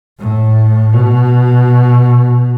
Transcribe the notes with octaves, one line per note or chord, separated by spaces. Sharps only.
A2
B2